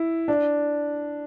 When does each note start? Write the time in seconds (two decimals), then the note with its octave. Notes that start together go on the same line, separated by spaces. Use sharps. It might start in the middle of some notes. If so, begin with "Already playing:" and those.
Already playing: E4
0.28 D4